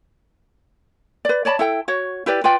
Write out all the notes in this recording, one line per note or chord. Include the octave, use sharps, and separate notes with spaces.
B4 D5
C#5 D5 A5 B5
E4 A4 G5
F#4 C#5
E4 G4 B4 D5
F4 B4 D5 G5